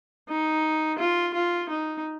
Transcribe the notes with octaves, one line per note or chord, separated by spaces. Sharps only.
D#4
F4
F4
D#4